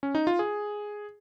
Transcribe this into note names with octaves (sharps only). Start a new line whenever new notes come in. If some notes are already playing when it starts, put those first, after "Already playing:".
C#4
D#4
F4
G#4